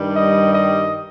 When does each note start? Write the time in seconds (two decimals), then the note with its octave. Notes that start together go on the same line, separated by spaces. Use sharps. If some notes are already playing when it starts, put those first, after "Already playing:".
Already playing: G2 D#3 G3
0.15 D#5
0.54 D#5